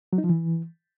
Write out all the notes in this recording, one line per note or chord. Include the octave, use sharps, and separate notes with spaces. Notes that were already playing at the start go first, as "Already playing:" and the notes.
F#3
D#4
F3
E3